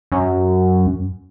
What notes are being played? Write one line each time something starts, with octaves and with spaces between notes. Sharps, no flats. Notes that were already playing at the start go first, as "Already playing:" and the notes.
F#2